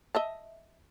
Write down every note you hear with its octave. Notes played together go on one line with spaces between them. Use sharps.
D#5 E5 A5